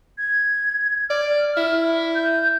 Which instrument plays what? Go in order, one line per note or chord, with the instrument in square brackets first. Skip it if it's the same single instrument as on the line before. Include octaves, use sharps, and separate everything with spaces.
[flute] G#6
[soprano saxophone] D5 [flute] F6
[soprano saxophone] E4
[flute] G6